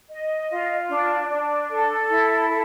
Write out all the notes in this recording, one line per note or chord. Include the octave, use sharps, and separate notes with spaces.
D#5
F4
D4
D4
A4
E4
A4